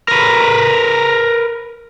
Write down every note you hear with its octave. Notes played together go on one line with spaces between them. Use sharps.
A#4 B4